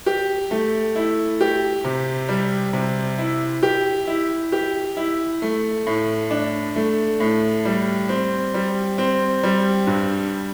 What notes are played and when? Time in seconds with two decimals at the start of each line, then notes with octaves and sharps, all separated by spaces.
0.06 G4
0.51 A3
0.96 E4
1.41 G4
1.84 C3
2.29 G3
2.73 C3
3.18 E4
3.63 G4
4.07 E4
4.52 G4
4.97 E4
5.42 A3
5.87 A2
6.31 D4
6.76 A3
7.20 A2
7.65 G3
8.09 C4
8.54 G3
8.98 C4
9.43 G3
9.87 G2